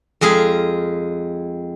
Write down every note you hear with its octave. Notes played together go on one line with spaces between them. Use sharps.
F2 G#3 G#4 F5 B5